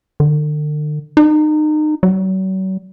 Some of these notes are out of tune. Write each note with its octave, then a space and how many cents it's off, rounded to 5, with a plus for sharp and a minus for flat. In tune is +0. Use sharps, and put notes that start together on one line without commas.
D3 +40
D#4 -30
F#3 +40